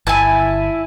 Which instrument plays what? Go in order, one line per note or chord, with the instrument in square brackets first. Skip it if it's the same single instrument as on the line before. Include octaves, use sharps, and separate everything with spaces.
[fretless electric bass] G1 [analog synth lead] E4 [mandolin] G#5 A5